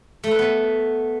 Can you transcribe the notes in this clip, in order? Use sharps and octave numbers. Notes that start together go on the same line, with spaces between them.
A3
B4
B3